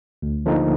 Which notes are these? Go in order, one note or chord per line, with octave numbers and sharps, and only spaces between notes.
D2
D3 F3 A#3 D#4